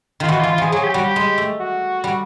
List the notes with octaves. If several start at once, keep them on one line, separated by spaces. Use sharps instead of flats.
D#3 F4
E3 F#4
F4
E3
F4
F3 G#4
F#3 G#4
G4
G3 F#4
G4
G#3
A3
F#4
G3